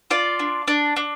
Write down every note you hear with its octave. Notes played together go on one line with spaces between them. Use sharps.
F4 D5
D4
D4
D4